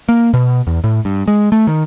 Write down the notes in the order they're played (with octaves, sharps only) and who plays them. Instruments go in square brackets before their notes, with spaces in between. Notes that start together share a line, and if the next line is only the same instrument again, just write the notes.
[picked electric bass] A#3
B2
E2
A2
G2
G#3
A3
D#3